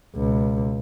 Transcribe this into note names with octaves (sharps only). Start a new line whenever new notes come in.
C#2 B2